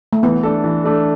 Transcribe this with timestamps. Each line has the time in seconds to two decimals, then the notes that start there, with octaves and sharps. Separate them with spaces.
0.13 A3
0.23 E3 B3
0.43 A3 D4 A4
0.64 E3
0.84 A3 D4 A4